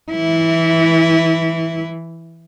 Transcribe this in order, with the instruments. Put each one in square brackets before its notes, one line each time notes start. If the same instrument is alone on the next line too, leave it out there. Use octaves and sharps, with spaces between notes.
[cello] E3 E4